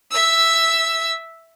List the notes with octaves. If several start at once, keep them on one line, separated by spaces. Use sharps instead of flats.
E5 E6